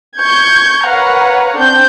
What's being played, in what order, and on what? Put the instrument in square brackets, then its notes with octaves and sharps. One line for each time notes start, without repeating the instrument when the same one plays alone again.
[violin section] C#6 G6 G#6
A#4 B4 C#5 F5 F#5 A#5
C4 D4 G6